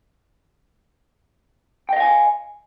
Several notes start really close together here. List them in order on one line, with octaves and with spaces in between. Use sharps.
G5 D#5 F5 G#5